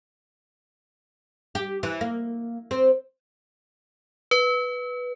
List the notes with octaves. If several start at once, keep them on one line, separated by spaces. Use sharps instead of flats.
G4
E3
A#3
C4
B4